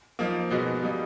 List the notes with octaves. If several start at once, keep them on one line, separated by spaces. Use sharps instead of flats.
F3 A#3 D#4
B2 G#3 B3 D#4 F#4
G3 A#3 D#4